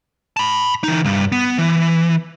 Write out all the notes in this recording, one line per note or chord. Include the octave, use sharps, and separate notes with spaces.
A5 B5
E3 D#4
C2 G2
B3
E3